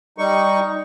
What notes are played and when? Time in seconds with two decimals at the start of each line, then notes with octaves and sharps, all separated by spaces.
0.18 G3 D#4 C#6